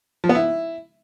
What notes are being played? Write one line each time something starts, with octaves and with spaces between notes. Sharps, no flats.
F3
B3
E4